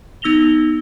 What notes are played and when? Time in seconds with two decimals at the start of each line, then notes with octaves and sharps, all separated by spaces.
0.22 B3 D#4 E6 A#6 F7 G7